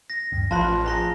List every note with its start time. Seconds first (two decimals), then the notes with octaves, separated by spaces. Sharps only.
0.10 A#6
0.32 D2 G2
0.51 A1 F3 F4 C5 F5 A5 B5 F#6
0.86 G#4 G#5 A#5 C6 A#6